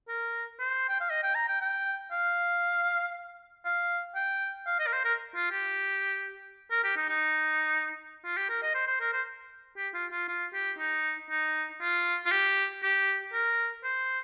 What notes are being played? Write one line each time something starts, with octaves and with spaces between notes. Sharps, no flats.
A#4
C5
G5
F5
D#5
G5
A#5
G5
G5
F5
F5
G5
F5
D#5
A#4
C5
A#4
F4
G4
A#4
G4
D#4
D#4
F4
G4
A#4
D#5
C5
C5
A#4
C5
G4
F4
F4
F4
G4
D#4
D#4
F4
F4
G4
G4
A#4
C5